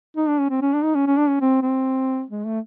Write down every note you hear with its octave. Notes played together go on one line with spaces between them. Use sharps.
D#4
D4
C#4
C4
C#4
D4
D#4
C#4
C#4
D4
C#4
C4
C4
G#3
A3